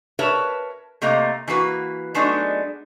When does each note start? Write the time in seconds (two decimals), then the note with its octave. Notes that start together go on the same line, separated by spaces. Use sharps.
0.19 A#4 B4 C#5 E5 A5
1.02 C3 A3 A#3 D#5 A#5
1.48 E3 A#3 F#4 B4
2.14 F#3 G#3 A3 B3 D4 D#4